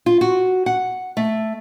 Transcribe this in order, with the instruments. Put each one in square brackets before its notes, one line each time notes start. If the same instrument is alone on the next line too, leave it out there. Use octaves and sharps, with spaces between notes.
[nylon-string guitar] F4
F#4
F#5
A3